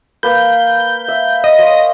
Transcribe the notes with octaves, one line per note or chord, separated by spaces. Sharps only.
A#3 B4 G6
E5
D#5
C5 C#5 D#5 F5